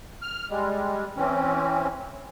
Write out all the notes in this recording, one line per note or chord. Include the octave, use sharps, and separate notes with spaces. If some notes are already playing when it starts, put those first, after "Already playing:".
F6
G3 G#3
E3 C4 C#4